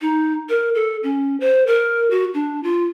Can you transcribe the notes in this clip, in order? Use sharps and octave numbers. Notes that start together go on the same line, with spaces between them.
D#4
A#4
A4
C#4
C5
A#4
F#4
D4
F4